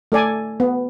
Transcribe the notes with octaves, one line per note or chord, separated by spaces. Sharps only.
A3 A4 D5 G#5
B3